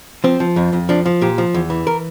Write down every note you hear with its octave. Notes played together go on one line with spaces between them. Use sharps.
F3 C4
F3
F2
F2
F3 D4
F3
A#2 G4
F3
E2
E3
A#4